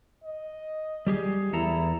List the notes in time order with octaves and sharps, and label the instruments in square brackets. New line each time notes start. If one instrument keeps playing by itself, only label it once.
[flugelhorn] D#5
[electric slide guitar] G3 G4 G#4
[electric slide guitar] E2 A4 A#5 [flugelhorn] E4